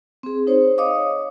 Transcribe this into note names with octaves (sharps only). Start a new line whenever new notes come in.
C4 G#4
D#4 C5 C#5
C#5 D#5 F5 D6 D#6